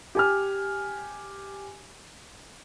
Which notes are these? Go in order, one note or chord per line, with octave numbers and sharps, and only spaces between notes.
G4 G#5 F6